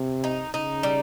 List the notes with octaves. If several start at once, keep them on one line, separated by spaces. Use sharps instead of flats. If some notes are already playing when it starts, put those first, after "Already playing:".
Already playing: C3
D#4
C#3 D#4
G3